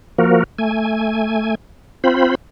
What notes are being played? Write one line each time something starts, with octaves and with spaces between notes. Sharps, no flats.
F3 A#3 F#4 A#4
A3 G#5
C4 F4 C5 B5